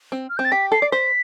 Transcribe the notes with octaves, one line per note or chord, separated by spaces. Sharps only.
C4
F6
C4 G6
A6
G4 B6
A4 C7
D5
C5 B6